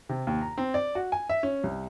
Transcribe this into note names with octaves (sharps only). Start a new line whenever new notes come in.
C3
D#2
A#5
C4
D5
F#4
G#5
E5
C#4
C2